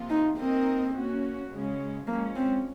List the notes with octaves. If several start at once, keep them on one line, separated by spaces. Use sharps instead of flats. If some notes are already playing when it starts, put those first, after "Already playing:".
Already playing: C3 F3 A#3 F4
D#4
A#3 C4 D#4 A#4 D#5
A#3 C#4 F#4
C#3 G#3 C#4
F3 G#3 A#3 C#4
C4